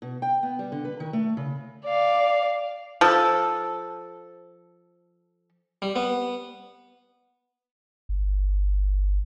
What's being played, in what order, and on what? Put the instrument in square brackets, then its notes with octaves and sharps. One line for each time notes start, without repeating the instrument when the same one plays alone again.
[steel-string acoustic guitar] B2
G5
B3
G3
D3
B4
D#3
A3
C#3
[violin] D5 F5
[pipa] F3 A4
[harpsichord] G3
B3
[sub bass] G1